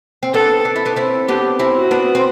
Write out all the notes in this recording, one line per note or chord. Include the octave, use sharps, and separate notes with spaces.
C4
B3 D4 A4
D4
E4
B3 D4
C4 E4
B3 D4 G4
C4 E4
F#4
B3 D4
C4